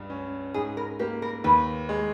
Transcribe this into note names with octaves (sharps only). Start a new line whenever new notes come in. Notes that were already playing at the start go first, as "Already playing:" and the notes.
Already playing: C#2 G2
C#4
G#2 G#4
A#4
A#3 G4
A#4
D#2 B4
G#3